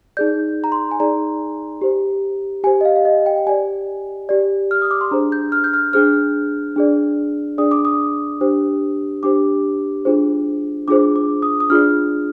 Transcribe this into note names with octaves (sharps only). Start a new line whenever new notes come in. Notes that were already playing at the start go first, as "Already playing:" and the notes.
D#4 G#4 D5 G6
A#5
C6
G#5
D#4 G#4 D5 A#5
G4 C5
G4 C5 G#5
D#5
F5
F5
D#5
G5
G5
G4 D5 G#5
G4 D5
F6
D#6
D6
C6
D4 G#4 C5 A#5
G6
F6
G6
F6
D4 G#4 C5 F6
D4 G#4 D5
D4 G#4 D5 D#6
D6
D#6
D4 G4 C5
D4 G4 C5 D6
D4 F4 G#4 C5
D4 F4 G#4 C5 D6
D6
D#6
D#6
D4 F4 G#4 D5 F6